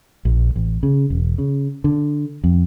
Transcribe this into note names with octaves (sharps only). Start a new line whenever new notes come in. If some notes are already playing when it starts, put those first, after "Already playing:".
A#1
A1
C#3
E1
C#3
D3
F2